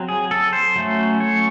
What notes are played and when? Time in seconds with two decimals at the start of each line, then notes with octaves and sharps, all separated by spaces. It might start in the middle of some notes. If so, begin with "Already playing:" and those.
Already playing: F#3 C4
0.08 G#4
0.31 A4
0.53 C5
0.76 F#3 A3 C#4
1.20 C#5